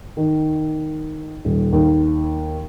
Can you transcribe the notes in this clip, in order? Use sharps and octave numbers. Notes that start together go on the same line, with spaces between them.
D#3
D#1
D#2